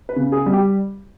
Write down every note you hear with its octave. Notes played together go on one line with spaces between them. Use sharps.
B4
C#3
G#4
G3
G4